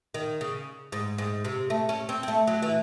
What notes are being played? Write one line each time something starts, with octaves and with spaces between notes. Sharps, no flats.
D#3
C#3
G#2
G#2
C3
A3
C#4
C4
C4
A3
F#3
E3